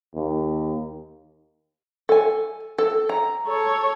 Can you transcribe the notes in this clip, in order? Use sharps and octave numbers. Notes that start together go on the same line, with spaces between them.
D#2
A4 G#5
A4
A#5
A4 C#5